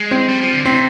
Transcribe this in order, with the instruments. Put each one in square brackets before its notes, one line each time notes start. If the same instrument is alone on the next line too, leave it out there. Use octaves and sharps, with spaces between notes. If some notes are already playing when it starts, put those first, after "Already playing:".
Already playing: [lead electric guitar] G#3
[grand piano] C4
[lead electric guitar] G3
F3
D3
[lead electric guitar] C3 [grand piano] C4